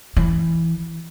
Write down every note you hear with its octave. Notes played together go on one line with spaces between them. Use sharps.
E3